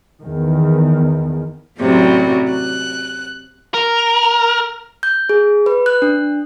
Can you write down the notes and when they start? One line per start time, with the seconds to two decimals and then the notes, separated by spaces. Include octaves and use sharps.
0.22 E2 D#3
1.78 F#2 A2 C3 F#3 G3
2.51 F#6
3.74 A#4
5.03 G6
5.29 G#4
5.66 B4
5.86 F#6
6.02 D4